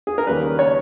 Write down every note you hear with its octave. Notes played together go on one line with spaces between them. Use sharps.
G#4
A#4
D#2 C#3 G3 A#3 B4
C#5